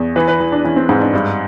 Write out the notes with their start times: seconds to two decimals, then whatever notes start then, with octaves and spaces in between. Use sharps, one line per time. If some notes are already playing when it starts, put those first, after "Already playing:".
Already playing: E2
0.16 E3 B4
0.28 B4
0.40 E3
0.52 D4
0.64 E3 C#4
0.76 C4
0.89 G#2 C4
1.02 D4
1.13 G2